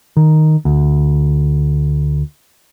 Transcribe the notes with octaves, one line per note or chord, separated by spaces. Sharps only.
D#3
D2